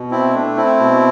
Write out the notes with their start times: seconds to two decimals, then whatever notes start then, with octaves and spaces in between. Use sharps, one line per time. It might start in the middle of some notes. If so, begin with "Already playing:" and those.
Already playing: B2
0.11 C4 E4
0.34 A3 D4
0.57 C4 E4
0.80 B2